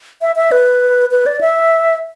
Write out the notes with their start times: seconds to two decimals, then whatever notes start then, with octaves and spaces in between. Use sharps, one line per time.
0.22 E5
0.36 E5
0.52 B4
1.11 B4
1.26 D5
1.41 E5